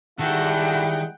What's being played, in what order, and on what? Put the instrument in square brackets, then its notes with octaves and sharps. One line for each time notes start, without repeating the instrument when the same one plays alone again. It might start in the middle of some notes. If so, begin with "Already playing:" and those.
[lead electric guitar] D#3 [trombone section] G3 G#3 E4 [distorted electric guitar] F#4 A4 [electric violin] F#5 G5